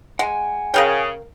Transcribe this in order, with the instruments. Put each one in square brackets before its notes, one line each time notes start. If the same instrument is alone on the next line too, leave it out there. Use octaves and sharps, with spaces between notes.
[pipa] G#3 [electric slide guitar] F#5 G#5
[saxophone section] C#3 [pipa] A#4 F5 G5